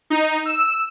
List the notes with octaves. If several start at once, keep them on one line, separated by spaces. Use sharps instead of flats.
D#4
E6